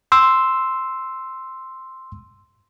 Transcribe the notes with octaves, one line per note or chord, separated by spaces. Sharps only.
C6 E6